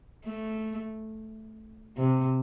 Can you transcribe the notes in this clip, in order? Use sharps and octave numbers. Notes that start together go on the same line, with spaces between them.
A3
C3